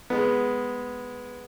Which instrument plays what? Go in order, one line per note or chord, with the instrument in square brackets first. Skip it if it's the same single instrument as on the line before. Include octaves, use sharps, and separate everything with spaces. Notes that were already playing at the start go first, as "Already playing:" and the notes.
[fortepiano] G#3 B3